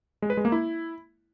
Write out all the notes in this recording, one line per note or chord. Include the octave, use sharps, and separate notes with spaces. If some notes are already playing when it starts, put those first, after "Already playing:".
G#3
B4
G#3
A#3
E4